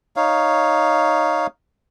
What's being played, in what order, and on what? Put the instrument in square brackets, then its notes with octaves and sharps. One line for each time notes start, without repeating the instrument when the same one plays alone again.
[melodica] D#4 C#5 F5